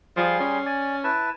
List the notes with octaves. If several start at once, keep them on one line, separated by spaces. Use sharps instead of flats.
F3 G3 G#4 C6
C#4
D5 G#5
E4 B4 A5